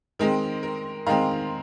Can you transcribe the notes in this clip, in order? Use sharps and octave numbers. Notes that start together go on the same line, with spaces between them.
D#3 G#3 C4 A#4
A#4
D#3 G#3 C4 F5 A#5